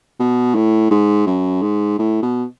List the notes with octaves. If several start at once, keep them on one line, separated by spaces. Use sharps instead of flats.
B2
A2
G#2
F#2
G#2
A2
B2